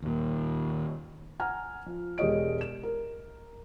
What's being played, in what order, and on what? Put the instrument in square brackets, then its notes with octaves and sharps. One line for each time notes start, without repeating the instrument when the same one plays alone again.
[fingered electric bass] D#2 A#2
[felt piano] F#5 G#5 A#5 F6
F3
E1 G#3 G4 C#5 D#5 D7
E7
A#4